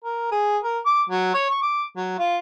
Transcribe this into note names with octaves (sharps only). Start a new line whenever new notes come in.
A#4
G#4
A#4
D6
F#3
C#5
C#6
D6
F#3
F4